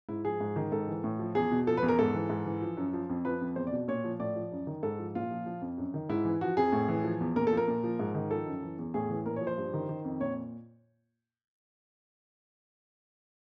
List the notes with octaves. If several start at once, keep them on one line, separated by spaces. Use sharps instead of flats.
G#2 E4
F3 G#4
G#2
D#3
G#2 A4
E3
A2
F3
E2 G#4
B2
F3 A4
B4
E2
A#4
G#2 A4
E3
G#2
E3
F3
F#2
F3
F2
F3 B4
F2
E2 C5
D5
B2
A#2 C#5
F3
A2 D5
F3
F#2
D#3
G#2 A4
F3
A#2 F4
F3
F3
F2
F#2
D#3
G#2 E4
E3
F3 F#4
F2 G#4
A2
E3
F3
E2
A#2 A#4
A4
F3
A#4
A#2
F3
G#2
D#3
F3 A4
F#2
E3
E2
A2 G#4
E3
A#2 A#4
C#5
F3
C5
G2
D#3
D#3
F2
A#2 C#5